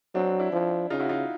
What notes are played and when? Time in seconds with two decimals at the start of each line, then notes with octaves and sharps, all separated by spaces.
0.15 F#3 C4 D4
0.39 D4 E4
0.52 F3
0.90 C#3 D#4 F4
1.00 E4 F#4
1.09 D#4 F4